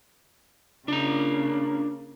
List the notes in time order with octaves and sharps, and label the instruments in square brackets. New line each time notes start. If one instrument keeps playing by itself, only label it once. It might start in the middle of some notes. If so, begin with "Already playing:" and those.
[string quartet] C#3 A#3 [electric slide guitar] D4 A#5